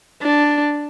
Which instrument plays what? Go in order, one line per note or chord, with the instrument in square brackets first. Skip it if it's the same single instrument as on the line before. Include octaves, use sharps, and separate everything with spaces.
[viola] D4